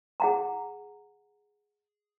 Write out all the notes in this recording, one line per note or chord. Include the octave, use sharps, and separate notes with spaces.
G#4 F#5 A#5